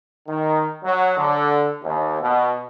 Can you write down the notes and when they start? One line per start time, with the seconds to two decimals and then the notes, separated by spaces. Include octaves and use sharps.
0.27 D#3
0.84 F#3
1.17 D3
1.83 D#2
2.21 B2